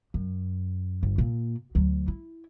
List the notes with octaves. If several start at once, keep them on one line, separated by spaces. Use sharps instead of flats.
F#2
G1
A#2
D2 F#3
E4